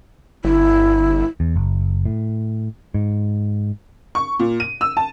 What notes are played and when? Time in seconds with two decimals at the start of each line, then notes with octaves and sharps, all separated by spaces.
0.44 G1 E4
1.40 E2
1.56 F#1
2.06 A2
2.94 G#2
4.15 C#6
4.39 A#2
4.60 D#7
4.81 E6
4.97 A5